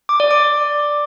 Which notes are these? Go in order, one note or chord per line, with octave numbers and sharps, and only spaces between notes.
D6
D5
D6